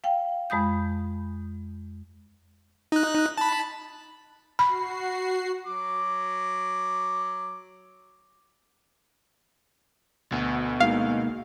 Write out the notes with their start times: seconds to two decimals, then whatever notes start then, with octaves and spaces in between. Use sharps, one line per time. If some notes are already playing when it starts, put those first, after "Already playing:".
0.04 F5 G5
0.50 F2 G#3 B5 D#6 G6
2.92 D#4 F#6
3.38 A5 B5
4.59 F#4 B5 C7
5.67 F#3 D6
10.32 D2 B2
10.80 G#3 A#3 D#4 F5